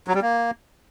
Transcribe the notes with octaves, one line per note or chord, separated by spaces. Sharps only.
F#3
G3
A#3